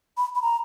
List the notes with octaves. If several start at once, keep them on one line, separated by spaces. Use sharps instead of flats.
B5
B5
A#5